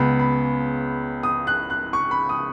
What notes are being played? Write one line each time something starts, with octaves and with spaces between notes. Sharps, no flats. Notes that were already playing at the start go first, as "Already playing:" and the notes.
Already playing: C#2 C#3 B3 B5
B5
D#6
F#6
F#6
C#6
B5
D#6